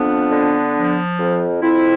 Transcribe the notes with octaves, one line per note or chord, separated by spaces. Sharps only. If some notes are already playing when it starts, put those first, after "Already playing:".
Already playing: F2 B3 D4
D3
F3
F2
F2 C4 E4